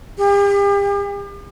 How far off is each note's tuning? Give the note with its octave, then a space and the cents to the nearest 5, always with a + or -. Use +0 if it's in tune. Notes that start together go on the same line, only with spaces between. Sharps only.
G4 +40